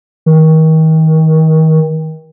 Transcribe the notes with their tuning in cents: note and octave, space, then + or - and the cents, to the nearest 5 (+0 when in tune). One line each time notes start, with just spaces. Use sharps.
D#3 +35